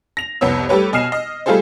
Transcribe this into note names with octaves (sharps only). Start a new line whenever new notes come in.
A#6 F7
C2 F2 B3 C#5 E6
G3 A3 G4 B4 C#5
B2 D#5 G#5 F6 C7 E7
D#5
G3 A3 F4 G#4 A4 C5